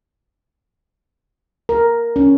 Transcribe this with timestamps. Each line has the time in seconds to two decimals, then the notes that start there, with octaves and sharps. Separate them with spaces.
1.69 A#4
2.16 C#4